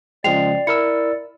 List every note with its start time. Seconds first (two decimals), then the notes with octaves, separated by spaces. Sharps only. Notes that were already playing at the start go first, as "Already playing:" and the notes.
0.24 C#3 F3 G#3 D5 G5 C7 F7
0.67 E4 A#4 E6 C#7